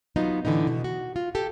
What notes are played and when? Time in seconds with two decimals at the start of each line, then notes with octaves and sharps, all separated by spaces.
0.16 F#3 B3 D#4 F4
0.45 A2 D3 E3 B3 D#4
0.67 B2
0.84 F#4
1.16 F4
1.35 G4 A4